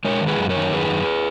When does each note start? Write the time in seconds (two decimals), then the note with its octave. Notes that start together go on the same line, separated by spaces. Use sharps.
0.05 G#3 A#4 C#5
0.21 D#3
0.27 G#4 B4
0.39 F#2
0.50 A#4 C#5
0.56 D#3
0.73 F#2 G#4 B4
0.90 F#2